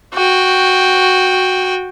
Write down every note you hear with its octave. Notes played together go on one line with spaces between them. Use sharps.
F#4 G5